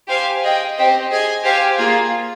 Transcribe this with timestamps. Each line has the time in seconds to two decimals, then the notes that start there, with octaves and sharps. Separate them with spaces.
0.08 G4 C5 F5 G#5
0.42 G#4 D#5 G5
0.77 C4 G4 C5 D#5
1.10 G#4 D#5 G#5
1.44 G4 C5 F5 G#5
1.78 A#3 F4 G#4